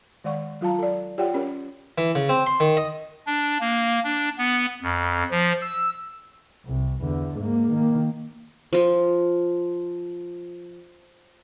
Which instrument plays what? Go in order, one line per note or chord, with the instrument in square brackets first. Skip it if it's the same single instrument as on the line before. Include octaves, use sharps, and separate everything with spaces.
[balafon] D#3 G#3 D5 F#5 C#6
F#3 F4 F5 A5 A#5
A4 D5
F4 G4 C#5 D5 F#5 G5
C#4 G4 A#4 C#5
[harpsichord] E3
C#3
C4
C6
D#3
D#5
[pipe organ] D4
A#3
D4
B3
F2
F3
E6
[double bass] C2
E2 D3
G#2 A#3
D#3 A#3
[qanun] F3 F4